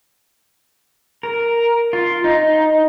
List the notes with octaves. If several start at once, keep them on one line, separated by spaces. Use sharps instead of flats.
A#4
F4
D#4